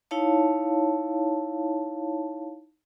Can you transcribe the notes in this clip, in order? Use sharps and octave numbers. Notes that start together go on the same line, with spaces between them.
D#4 E4 C#5 F5 A5